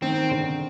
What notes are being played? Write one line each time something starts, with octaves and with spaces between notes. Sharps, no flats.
D#3 C4
D3